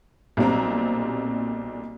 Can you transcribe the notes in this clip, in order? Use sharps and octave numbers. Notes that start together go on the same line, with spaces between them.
B1 A#2 G3 C4 A#5